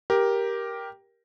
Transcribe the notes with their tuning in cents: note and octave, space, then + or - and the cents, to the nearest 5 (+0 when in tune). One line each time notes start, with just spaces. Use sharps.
G4 +0 A#4 +10